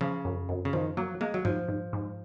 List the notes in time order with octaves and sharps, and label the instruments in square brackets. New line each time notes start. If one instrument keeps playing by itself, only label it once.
[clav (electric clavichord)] C#3 [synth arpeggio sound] F3
[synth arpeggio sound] F#2
F#2
[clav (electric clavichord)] C#3
[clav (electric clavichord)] D#3 [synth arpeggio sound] F3
[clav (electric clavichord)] F#3 [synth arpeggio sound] A#3
[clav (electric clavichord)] G#3 [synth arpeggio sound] A#3
[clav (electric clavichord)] F#3
[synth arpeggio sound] G#2 [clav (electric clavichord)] F3
[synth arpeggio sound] G#2
G#2